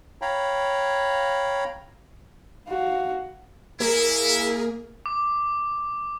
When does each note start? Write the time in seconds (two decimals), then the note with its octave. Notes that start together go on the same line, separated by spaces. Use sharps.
0.22 C#5 F5 G5 A#5 B5
2.68 F#4 F5
3.80 A#3 E4 G#4 A#4
5.06 D6